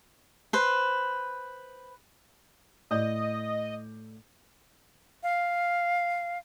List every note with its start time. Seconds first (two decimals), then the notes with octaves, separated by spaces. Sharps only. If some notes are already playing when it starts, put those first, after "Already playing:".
0.53 B4 C5
2.91 A2 D5 D#5 G6
5.23 F5